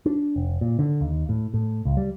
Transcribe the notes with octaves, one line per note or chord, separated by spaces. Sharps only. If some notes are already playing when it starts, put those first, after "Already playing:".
D4
F1
A#2
D3
D#2
A2
A2
C#2
G3